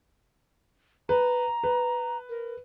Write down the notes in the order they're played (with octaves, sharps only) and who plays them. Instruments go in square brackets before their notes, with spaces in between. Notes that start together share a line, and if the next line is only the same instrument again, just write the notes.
[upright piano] B4 [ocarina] A#5
[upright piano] B4
[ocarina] A#4